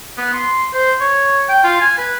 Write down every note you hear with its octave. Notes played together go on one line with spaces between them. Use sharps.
B3
C6
C5
C#5
G5
F4
G#5
B4